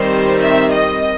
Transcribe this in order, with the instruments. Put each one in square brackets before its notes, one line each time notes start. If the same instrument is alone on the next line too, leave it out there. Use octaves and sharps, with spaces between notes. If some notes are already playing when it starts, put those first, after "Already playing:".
Already playing: [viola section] D#3 G3 C4 C5
E5
D#5